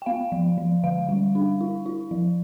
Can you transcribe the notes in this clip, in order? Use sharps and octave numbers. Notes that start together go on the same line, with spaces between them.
G5
B3 F5
F3
F3
D3 F5
G3
D4
E4
E4
F3